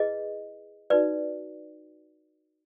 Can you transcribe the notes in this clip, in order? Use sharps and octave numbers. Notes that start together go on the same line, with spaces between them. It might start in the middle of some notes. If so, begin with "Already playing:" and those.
Already playing: E4 G#4 B4 D#5
D#4 F#4 B4 D5